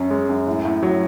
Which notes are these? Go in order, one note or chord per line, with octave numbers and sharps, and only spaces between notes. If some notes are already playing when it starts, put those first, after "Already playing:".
Already playing: F#2 C#4
G#3
F#2
A2
A2
F#3